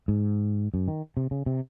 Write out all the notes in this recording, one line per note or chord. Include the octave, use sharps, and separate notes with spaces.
G#2
F#2
D#3
C3
C#3
C3